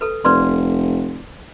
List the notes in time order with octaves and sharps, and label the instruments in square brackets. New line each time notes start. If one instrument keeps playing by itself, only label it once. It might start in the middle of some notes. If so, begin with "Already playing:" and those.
[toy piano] A4 B4
[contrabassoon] F1 [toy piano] B4 D5 C6